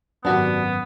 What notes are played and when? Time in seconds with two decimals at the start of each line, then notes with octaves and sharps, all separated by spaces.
0.25 G#1 F#2 B3 D4 F#4 G4